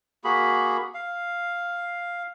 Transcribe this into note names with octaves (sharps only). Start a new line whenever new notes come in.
A#3 F#4 G#4 B5
F5